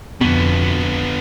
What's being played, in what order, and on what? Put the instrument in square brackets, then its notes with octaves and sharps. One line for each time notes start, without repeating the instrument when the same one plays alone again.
[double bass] F2 [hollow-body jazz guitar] B2 [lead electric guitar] D3 B3